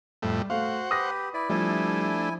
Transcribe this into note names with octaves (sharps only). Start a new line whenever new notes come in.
F2 A2 G3 A3
A3 F#4 C5 F5 F#5
G4 B4 D#6 A#6
E4 B4 D5
F3 G3 A3 D4 E4 G#5